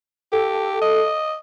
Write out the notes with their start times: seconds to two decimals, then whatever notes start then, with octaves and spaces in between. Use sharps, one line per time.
0.32 G4 A4
0.82 D#5